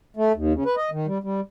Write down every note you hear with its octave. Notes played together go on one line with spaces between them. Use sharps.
A3
D#2
C#3
B4
D#5
D#3
G3
G3